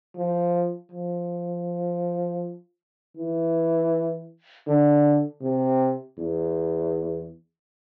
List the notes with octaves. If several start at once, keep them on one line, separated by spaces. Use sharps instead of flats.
F3
F3
E3
D3
C3
E2